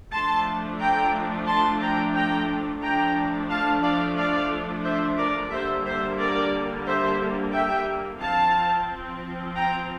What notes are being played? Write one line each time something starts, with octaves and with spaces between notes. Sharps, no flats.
F3 A3 D4 A5 C6
G5 A#5
A5 C6
G5 A#5
G5 A#5
F3 A3 D4 G5 A#5
F5 A5
D5 F5
D5 F5
C5 E5
A#4 D5
D3 G3 A#3 C5 E5
C5 E5
A#4 D5
C5 E5
E5 G5
F3 C4 F5 A5
G5 A#5